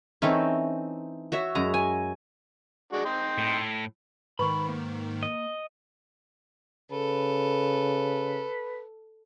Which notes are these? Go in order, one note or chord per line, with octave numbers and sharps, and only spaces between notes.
E3 A3 C4 C#4 D#4
F#4 C#5 E5
F#2 G#3 A#5
G#5
G#3 D4 F#4
D#4 G5 C6
A2
G#2 D#3 B4 B5 C#6
A#3
D#5
C#3 A4 B4